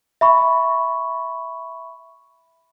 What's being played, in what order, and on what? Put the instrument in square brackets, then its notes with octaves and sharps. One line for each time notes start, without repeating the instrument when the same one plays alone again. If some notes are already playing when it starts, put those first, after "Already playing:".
[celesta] E5 B5 C#6